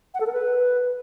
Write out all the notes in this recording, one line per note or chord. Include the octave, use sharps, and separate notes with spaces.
F#5
A4
A#4
B4